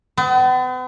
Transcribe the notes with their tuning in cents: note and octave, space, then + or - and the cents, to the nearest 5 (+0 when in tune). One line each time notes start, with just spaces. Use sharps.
B3 +45